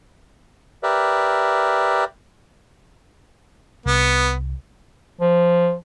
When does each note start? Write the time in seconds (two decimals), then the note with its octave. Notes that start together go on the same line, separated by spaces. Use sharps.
0.83 G4 A#4 B4 D5 E5
3.86 C2 B3
5.20 F3